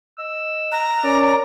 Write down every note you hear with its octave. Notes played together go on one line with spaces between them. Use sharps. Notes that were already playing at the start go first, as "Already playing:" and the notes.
D#5 E6
A#5 F#6
C#4 A#4 D5